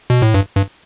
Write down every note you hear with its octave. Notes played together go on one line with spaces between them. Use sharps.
B2
A2
G2
G2